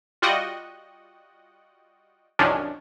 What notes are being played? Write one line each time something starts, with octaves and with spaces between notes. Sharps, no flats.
G3 F4 F#4 D#5 F#5 G5
C2 F#2 D#3 F3 C#4 D4